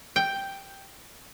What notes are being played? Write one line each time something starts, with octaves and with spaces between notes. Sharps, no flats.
G5